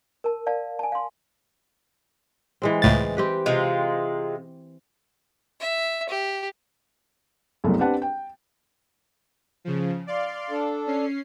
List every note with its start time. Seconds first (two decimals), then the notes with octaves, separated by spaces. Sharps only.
0.24 A#4 A5
0.47 D5 F5 A5
0.79 G#5 A5
0.92 F5 C6
2.62 E3 G#3 C4
2.82 C#2 A2 A6
3.17 C4 G4 B4
3.46 C3 G#3 F4
5.60 E5
6.09 G4
7.64 F#1 C2 F#2 G#3 A3 B3
7.79 C4 D4 G4 B4 F#5 A5
8.02 G5
9.65 C#3 F3
10.07 D5 F5 C6
10.50 D4 A4
10.87 C#4 C7